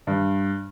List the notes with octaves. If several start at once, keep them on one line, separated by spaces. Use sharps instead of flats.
G2